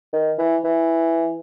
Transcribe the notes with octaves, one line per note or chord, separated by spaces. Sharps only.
D#3
E3
E3